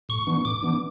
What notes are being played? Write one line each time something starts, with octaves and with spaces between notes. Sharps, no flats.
A2 C#6
E3 B3 D4
A2 D6
E3 B3 D4